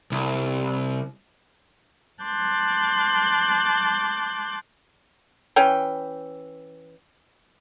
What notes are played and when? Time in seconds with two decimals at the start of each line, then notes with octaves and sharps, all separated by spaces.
0.12 C2
2.23 A5 C6 D6 F#6 G6
5.56 E3 C#4 G5